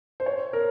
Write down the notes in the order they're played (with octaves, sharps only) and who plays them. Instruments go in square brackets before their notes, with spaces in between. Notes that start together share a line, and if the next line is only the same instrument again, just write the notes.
[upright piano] C5
C#5
A#4